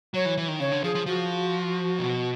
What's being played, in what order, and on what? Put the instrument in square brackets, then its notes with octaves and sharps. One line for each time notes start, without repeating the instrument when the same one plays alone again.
[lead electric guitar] F#3 [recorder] C#5
[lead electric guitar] E3
E3
D#3
[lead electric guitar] C#3 [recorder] C#5
[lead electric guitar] D3
[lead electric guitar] F3 [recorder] G#4
[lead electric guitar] F3
[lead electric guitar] F3 [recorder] F#4
[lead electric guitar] B2